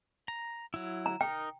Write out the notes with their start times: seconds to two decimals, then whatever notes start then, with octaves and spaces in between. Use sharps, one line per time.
0.28 A#5
0.74 F#3 E4
1.06 A#5
1.21 D#4 A#4 G5